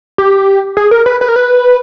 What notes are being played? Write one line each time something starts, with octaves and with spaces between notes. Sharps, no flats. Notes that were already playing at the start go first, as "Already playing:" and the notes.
G4
G#4
A#4
B4
B4
A#4
B4